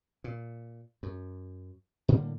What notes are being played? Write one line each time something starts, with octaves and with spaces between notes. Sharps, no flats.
A#2
F#2
A2 D3 G3 A#3